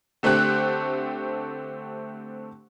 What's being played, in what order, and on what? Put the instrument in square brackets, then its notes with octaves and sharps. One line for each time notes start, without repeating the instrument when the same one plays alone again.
[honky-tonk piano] D3 A3 C4 G4 F#6